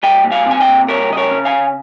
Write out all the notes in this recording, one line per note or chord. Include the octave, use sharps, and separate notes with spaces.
G3 D#5 G5
A#2
F5 G#5
C4 G#5
D#5 G5
A#2
G3 A#4 C#5
C#3 D#5
A#4 C#5
C#4
F5 G#5
C#3